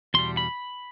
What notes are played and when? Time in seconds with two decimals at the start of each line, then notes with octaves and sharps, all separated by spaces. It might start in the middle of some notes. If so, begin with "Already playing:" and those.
0.14 E2 B2 G3 C6
0.37 B5